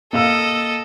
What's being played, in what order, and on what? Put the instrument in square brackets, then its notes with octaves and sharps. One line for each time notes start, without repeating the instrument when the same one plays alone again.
[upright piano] A#3 F5 E6 [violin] A4 D#5